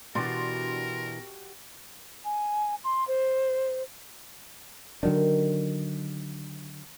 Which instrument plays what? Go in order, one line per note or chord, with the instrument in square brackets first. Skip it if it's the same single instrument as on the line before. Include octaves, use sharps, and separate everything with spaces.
[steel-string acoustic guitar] B2 E3 [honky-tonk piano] D4 C6 A6 [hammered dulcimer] F#4 G4 [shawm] A#4
[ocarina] G#5
C6
C5
[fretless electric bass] D3 F#3 D4 [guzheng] D#3